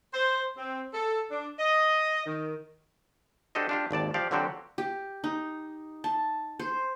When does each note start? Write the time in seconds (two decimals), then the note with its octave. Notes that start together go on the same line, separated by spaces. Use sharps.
0.13 C5
0.57 C4
0.94 A4
1.31 D4
1.59 D#5
2.26 D#3
3.55 D4 F#4 G4 A4 C5 D#5
3.69 D4 F4 G4
3.91 G#1 D#2 D5 A5
4.14 F3 G4 D5 F5
4.31 D3 F3 F#3 C4 F#4 G4
4.78 G4
5.24 D#4
6.04 A5
6.59 C5